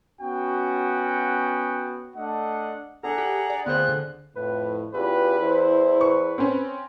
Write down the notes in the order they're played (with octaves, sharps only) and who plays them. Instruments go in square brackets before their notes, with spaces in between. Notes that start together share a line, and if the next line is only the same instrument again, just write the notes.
[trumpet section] B3 C#4 F#4 G5
A3 D4 D#5 F#5
[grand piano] D4 A4 [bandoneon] G#4 A#5 [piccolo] F#5
[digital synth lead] G4
D5
[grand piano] D2 G#4 C5 [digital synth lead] B3 [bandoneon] C4 F4 [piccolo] F#6
[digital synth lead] D3
[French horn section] F2 A2 [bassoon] B4
[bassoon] E2 [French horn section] C#4 F4 G4 [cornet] B4
[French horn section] E3 E4 C5
[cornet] B4 [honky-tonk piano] C#6
[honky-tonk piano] C4 C#4